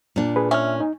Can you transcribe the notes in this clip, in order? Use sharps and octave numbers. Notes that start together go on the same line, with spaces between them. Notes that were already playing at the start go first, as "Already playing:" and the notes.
A#2 D4
G#4 B4
C#4 E5 F6
D#4